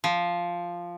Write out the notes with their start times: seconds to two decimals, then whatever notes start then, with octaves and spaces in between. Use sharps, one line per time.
0.04 F3